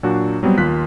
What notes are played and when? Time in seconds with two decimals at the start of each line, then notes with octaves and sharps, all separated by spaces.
0.03 A#2 F#3 D4 F#4
0.43 F#3 G3 B3 C4
0.58 D#2 F4 F#6 B6